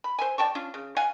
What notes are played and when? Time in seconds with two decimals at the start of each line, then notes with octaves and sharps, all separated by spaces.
0.04 B5
0.19 C5 E5 G#5
0.38 D5 G5 A5 C#6
0.55 C#4 D4 F4
0.74 C#3
0.96 C#5 F5 F#5 G#5